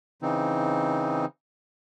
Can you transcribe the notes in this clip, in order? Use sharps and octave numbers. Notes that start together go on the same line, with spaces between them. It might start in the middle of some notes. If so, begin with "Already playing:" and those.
C#3 E3 C4 D#4